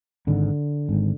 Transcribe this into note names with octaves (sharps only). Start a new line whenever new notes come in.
G#1 G#2 D3
G#1 G#2